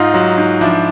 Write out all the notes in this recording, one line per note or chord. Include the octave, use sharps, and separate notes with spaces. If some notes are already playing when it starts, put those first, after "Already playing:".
Already playing: G#2 D#4 F4
F#3
G#2
F3 D4 E4